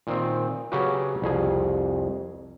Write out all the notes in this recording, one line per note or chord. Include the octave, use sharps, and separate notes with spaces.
A#2 D#3 C4
C#3 F#3 C#4 F#4 G4 B4
C2 F2 G#4